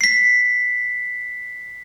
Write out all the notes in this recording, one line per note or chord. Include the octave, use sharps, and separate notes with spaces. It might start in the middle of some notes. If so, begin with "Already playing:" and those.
B6 C7